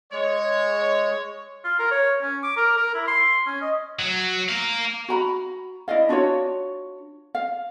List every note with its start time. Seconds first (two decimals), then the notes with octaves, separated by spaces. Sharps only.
0.12 G#3 C#5
1.64 F4
1.79 A#4
1.91 C#5
2.22 C#4
2.43 D6
2.57 A#4
2.77 A#4
2.94 E4
3.07 C6
3.46 C#4
3.61 D#5
3.99 F#3
4.49 F5 A#5
5.09 F#4 A#5 B5
5.88 E4 D5 D#5 F5
6.09 D4 F4 F#4 C#5
7.35 F5